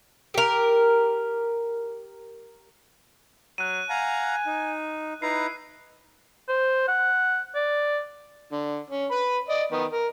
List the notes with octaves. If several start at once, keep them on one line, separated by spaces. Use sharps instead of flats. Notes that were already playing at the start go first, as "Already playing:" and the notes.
G4 A#4
F#3 F#6 D#7
F5 F#5 G#5 A#5
D#4
D#4 E4 B4 A#5 C7
C5
F#5
D5
D3
C#4
B4 B5
D5 D#5
D#3 B3
A#4